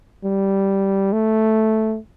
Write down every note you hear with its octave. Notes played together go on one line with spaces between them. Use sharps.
G3
A3